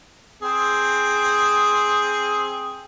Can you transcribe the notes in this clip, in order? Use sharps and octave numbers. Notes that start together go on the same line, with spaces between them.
C4 G#4